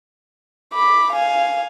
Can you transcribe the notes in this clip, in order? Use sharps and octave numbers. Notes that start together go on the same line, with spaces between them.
B5 D6
F5 G#5